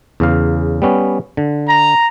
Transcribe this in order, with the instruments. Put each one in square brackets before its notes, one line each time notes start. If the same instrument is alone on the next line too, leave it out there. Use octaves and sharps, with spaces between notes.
[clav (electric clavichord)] E2 C#3 F5
G3 B3 C#4
D3
[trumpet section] A#5